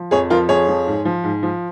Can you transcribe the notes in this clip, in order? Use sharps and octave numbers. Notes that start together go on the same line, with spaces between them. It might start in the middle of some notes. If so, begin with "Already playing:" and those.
Already playing: F3
F2 G#4 C#5
F3 F4 A#4
F2 G#4 C#5
F3
G#2
F3
G#2
F3